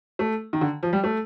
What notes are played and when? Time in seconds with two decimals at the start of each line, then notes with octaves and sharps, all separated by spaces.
0.19 A3
0.53 D#3
0.61 D3
0.83 F3
0.93 G3
1.04 A3